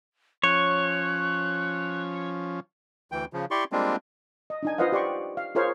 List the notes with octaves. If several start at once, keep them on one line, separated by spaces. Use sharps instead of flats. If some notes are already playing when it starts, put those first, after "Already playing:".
F3 C#4 C#5 F#6
D2 E3 G5
C#3 F3
E4 G4 D5 C6 C#6
G3 G#3 A#3 C4 D4 F4
D#5
D4 D#4 G#5
F4 B4 C5 D#5 F5 F#5
G4 D5 C6 C#6
F5
F4 G#4 A#4 C5 C#5 F5